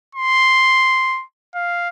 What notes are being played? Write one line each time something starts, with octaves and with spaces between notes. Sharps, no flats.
C6
F5